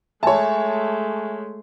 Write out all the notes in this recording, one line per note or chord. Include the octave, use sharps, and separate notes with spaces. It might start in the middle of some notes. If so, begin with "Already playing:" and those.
G#3 A3 C#5 E5 G#5 A5